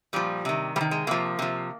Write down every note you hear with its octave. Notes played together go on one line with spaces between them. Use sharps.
A#2 F3 G3
C3 D#3
C3 D#3 G3
G#3
C3 F3 A#3
C3 F3